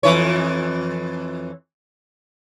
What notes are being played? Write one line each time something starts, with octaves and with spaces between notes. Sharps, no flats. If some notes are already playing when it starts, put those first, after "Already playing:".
F2 E3 C#5